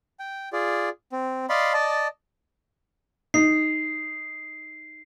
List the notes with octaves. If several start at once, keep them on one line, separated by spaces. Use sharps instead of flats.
G5
F4 G#4 D5
C4
D5 D#5 F5 B5 C6
D5 D#5 A5
D#4 C7